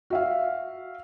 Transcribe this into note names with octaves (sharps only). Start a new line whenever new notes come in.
F#4 E5 F5